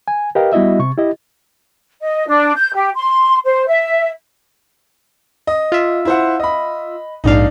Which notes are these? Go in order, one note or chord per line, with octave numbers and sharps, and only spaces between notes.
G#5
G4 A#4 B4 D#5 F5 G5
G3 B3 E4 F#4 D#5 E5
C3 C#6
E4 G4 D#5
D#5
D4
G6
G4
C6
C5
E5
D#5
F4 E5
E4 C5 F#5
D#5 B5
A#1 G#2 D4 D#4 F5